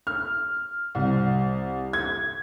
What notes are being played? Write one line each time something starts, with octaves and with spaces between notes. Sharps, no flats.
F6
C2
G#6